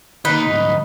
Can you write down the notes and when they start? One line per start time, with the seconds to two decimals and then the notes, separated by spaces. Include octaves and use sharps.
0.25 D#3 A#3 D#4 B4
0.47 D2 G#2